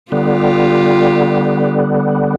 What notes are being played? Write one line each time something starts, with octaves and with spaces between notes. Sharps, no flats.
D3 G3 B3 F4 G4